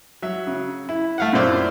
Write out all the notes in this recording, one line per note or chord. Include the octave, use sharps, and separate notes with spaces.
F#3 E5
C#3
E4
A3 F5 F#5
F#2 A#2 E4 C5 D5 E6